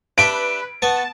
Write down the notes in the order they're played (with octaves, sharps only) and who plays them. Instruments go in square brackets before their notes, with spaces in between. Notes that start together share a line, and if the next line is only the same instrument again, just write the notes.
[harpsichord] D4 G4 E5 [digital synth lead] B4 [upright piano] D7
[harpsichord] B3 C#6 [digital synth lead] A5